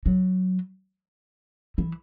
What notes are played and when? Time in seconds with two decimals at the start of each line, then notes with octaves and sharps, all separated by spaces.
0.06 F#3
1.78 E3